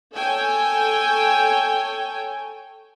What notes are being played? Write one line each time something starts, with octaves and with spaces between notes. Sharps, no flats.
A4 C#5 G5 G#5